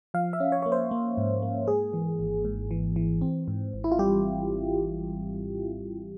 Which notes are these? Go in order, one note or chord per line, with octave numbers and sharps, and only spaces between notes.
F3 F5
E5
C#4
C#5
A#3 C#5
C5
A#3
G#2
A#3
G#2 G#4
E3
G#1
G#2
E3
E3
C4
G#2
G#1
E4
F4
G3 G4